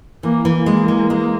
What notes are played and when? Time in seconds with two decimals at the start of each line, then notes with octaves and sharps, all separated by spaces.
0.23 E3 A#3
0.45 E3
0.56 A#3
0.66 G#3
0.88 G#3
1.10 G#3